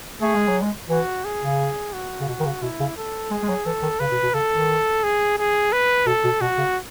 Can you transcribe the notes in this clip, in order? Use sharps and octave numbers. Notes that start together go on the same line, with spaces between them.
A3 G#4
G#3
F#3
G#3
E3 F#4
G#4
C#3
F#4
C#3
B2
D#3
C#3
B2 E4
C#3
A4
G#3 G#4
G#3
F#3
E3 A4
D#3
C#3 B4
B2
B2
C#3 A4
D#3
G#4
G#4
B4
B2 A4
B2
B2 F#4
C#3